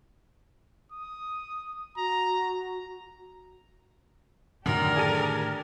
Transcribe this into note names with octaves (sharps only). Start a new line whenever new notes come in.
D#6
F#4 A#5
F#2 A2 D3 D#3 D4 G4 A#4
G#4 A4 D#7